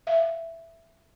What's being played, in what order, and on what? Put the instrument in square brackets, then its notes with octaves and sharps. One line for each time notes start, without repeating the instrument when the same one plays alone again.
[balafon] E5 F5